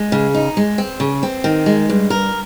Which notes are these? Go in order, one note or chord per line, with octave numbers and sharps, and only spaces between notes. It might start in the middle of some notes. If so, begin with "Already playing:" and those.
Already playing: G#3
C#3
D#4
G#3
C4
C#3
C4
D#3
G#3
G2
A#4